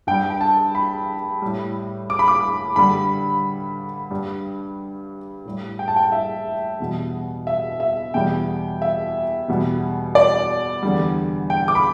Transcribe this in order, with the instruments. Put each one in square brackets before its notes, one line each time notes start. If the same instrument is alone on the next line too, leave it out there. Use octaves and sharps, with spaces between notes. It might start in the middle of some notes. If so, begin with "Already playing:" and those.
[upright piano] G2 G3 G5
G5
A5
B5
A2 G3
D6
B5
D6
G2 D3 G3 B5
G2 G3
A2 G3
G5
A5
G5
E5
E2 B2 G3
E5
E5
E2 B2 G3 G5
E5
E2 B2 G3
D5
E2 D3 G3
G5
D6
B5